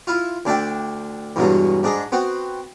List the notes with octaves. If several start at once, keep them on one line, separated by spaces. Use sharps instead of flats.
E4 F4
D2 D4 D5 E5 G5
E2 G2 B2 F#3 G#3
G#2 D4 G#4 D#5
B3 C4 F#4